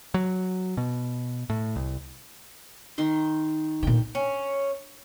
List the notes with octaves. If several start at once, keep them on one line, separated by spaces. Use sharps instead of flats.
F#3
B2
A2
C2
D#3 D#4 C6
A#2 D3 G5
C#4